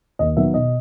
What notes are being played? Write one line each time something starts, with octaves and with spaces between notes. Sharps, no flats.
D#2 D#5
D#3 F#3 B3 E5
B2 D#5